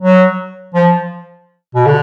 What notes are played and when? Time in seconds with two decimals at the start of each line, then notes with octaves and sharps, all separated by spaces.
0.01 F#3
0.75 F3
1.75 B2
1.86 D3